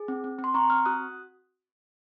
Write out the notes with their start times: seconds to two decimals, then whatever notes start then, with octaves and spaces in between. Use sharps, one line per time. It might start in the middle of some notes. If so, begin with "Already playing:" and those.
Already playing: G#4
0.08 C4
0.24 C4
0.39 C4
0.44 C6
0.54 C4 A#5 C#6
0.70 C4 C#6 F6
0.85 F#4 D#6 F#6